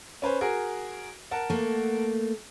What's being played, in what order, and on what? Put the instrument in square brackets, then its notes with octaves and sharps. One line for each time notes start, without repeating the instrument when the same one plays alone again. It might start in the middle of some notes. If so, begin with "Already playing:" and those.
[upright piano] C#4 B4 C5
F#4 G#4 A#4
A#4 F#5 A5
[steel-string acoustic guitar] A3 A#3